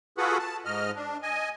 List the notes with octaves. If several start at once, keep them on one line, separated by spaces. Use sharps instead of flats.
F4 F#4 G#4 A4 B4 F#5
A5
G#2 D#5 F6
D4
D#5 G#5